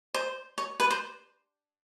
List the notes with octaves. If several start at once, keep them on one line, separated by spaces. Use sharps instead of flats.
C5
C#5
B4
C5